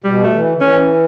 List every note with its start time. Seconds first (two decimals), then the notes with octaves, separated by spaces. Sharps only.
0.04 B2 G3
0.24 A3
0.33 E3
0.52 D3
0.61 E3 C#4